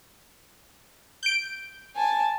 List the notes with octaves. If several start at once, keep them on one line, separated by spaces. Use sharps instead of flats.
G6 D7
G#5 A5